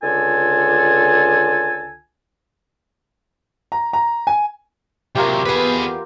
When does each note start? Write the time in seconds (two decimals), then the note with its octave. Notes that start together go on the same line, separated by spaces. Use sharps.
0.02 C#2 D3 F4 A4 G#5
3.72 A#5
3.93 A#5
4.27 G#5
5.15 C3 F#3 A#3 F4 G4
5.46 E2 B3 G#4 B4